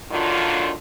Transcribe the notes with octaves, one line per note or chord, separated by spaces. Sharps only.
D3 D#3 F#3 D4 F4